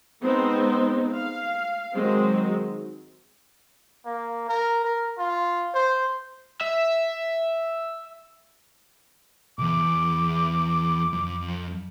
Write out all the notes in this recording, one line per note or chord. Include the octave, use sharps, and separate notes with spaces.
G#3 B3 C4 D#4
F5
D#3 F#3 G#3 C4
A#3
A#4
A#4
F4
C5
E5
B1 E2 D6
F2